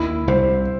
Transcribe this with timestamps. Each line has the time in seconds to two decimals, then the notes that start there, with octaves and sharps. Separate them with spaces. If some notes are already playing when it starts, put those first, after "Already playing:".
Already playing: D#2 D#3 E4
0.28 C2 C3 C5